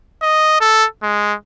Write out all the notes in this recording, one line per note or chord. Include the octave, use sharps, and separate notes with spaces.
D#5
A4
G#3